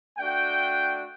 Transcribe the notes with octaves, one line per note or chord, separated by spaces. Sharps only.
A3 D4 F#4 G5